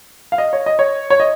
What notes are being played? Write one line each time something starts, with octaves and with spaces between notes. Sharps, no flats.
F5
D#5
C#5
D#5
C#5
C#5
D#5